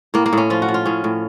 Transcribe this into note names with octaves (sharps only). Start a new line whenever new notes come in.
A2 A#3
A#3
A2 C#4
F3 F4
F#4
F3
F4
A2 C#4
A2